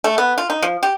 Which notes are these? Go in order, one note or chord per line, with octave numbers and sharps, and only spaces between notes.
A3
B3
F4
D#4
F3
G4